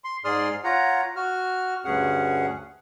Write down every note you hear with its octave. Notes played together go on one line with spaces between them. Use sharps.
C6
G#2 G#4 D5 C6 D#6 F6
F4 C#5 F#5 A#5
F#4 F6
D2 G2 C#4 G#4 F#5